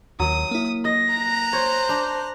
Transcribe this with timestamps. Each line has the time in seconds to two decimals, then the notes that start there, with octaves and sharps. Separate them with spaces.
0.20 D#2 F#3 D#6
0.51 A#3 E4
0.85 D#5 A#6
1.14 A#5 F#6
1.53 C5 C#5
1.89 D4 A5